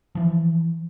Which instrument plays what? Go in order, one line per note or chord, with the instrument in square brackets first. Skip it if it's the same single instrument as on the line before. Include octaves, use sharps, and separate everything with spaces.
[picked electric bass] E3 F3